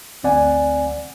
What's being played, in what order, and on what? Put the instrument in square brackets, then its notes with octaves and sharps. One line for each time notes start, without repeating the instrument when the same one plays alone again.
[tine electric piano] G1 D2 C4 D5 F#5 G#5